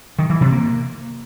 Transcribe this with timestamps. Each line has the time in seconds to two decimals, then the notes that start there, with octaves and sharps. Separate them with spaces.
0.19 D#3
0.30 E3
0.41 C3
0.52 A#3